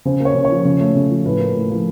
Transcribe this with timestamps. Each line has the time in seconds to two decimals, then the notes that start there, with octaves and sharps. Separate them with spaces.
0.05 C#3 C5
0.20 A#3
0.25 C#5
0.35 C#3
0.45 C#5
0.50 F3
0.65 C#3
0.81 A3
0.96 C#3
1.11 F3
1.25 A2 B4
1.40 A#3
1.55 A2
1.70 F3